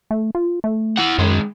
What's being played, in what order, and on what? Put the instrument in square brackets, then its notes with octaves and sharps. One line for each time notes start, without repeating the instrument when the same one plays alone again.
[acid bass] A3
F4
A3
[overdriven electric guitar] E4 F#5
[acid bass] F#2 [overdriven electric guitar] D#3 G#3